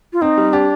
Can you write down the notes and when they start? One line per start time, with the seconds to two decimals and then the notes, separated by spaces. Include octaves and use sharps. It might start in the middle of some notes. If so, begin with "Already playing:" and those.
0.13 F4
0.21 C4 D#4
0.38 G3
0.53 D4 G4